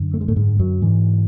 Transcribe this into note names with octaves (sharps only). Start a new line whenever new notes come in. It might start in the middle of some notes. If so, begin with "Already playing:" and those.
Already playing: F#2 D3
A3
G#3
A2 A3
G#2 G#3
F#2 F#3
G#2 E3